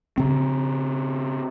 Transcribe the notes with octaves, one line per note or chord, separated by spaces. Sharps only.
C#3 C4